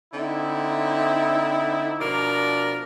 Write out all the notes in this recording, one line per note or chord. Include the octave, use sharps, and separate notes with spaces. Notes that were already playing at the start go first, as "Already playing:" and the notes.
D3 C4 D#4 E4
B2 F3 D4 A#4 D5 A#5